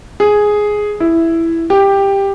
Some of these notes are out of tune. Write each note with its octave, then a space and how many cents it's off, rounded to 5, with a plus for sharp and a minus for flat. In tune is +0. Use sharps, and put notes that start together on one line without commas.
G#4 +5
E4 +5
G4 +10